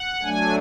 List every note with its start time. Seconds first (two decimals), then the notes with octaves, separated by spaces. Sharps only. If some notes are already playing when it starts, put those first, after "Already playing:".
Already playing: F#5
0.23 F#3 A3 D4 G#5